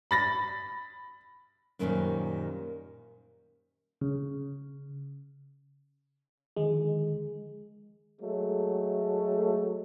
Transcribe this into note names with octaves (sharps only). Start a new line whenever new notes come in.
B5 A6 A#6
F#2 A#2 D#3 G3 C#4 C5
C#3
D3 D#3 F3 G#3
F#3 G#3 A3